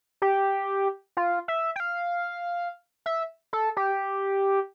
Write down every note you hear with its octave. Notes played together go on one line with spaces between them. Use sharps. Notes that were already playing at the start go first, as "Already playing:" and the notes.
G4
F4
E5
G5
F5
E5
A4
G4